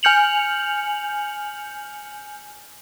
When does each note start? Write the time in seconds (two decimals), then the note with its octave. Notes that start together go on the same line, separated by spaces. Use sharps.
0.03 G#5 F6 G6 C#7 F7 F#7